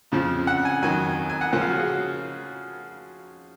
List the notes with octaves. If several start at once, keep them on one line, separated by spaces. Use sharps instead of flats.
F2 C#3 F3
F#5
G#5
F2 D#3 F#3 G#5
G#5
F#5
C#3 F3 A#3 C#4 F4 F#5
F5
F#4
G#4